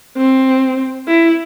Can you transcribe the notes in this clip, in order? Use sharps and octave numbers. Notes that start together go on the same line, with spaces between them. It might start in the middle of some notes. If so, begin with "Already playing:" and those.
C4
E4